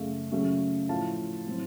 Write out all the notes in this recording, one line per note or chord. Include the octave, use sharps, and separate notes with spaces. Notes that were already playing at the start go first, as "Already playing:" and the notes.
Already playing: F#2 C#3 A3 C#4 F5
C#3 F#3 A3 C#4
A2 F3 A3 F5 A5
A2 F#3 C4